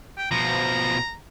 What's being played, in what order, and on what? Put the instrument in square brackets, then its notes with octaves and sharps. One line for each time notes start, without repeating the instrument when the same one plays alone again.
[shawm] G5
[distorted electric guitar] B2 F3 [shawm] A#5